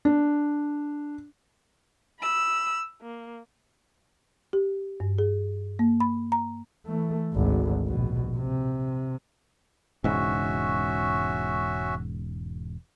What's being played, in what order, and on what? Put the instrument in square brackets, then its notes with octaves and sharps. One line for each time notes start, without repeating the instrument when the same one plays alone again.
[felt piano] D4
[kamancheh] B5 E6
A#3
[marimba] G4
G2
G#4
A#3
B5
A#5
[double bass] E3 A3
G#1 D2
A#1 B2
C3
[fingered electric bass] E1 G#2 C#3 [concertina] C#4 F#4 E5